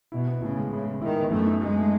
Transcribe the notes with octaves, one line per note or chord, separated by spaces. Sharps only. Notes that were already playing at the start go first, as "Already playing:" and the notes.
B2 E4
B3
A2 C#3
G#3
C#3 E4
G#3
D#3 E4
B3
F#2 A3
D#4
G#3 D#4
A3